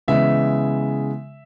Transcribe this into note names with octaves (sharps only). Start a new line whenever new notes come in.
C#3 E3 G#3 B3 E5